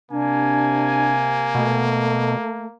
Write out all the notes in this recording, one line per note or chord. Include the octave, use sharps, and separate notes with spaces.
C3 A#3 D4 G#5
B2 A3